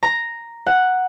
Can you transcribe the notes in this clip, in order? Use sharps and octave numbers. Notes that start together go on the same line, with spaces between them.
A#5
F#5